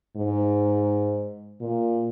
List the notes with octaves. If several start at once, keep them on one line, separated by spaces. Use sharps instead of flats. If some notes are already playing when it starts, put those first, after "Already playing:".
G#2
A#2